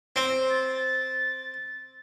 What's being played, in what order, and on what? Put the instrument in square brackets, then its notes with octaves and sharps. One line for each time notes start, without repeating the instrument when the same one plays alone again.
[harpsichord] C4
[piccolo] A6